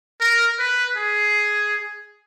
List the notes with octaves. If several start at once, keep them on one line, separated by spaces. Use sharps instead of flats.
A#4
B4
G#4